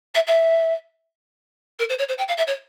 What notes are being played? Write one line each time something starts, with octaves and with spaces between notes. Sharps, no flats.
E5
E5
A#4
C5
C#5
C5
G5
F5
E5
C#5